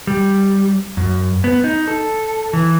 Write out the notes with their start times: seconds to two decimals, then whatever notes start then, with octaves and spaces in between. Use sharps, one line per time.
0.07 G3
0.97 F#2
1.44 B3
1.64 D#4
1.88 A4
2.53 E3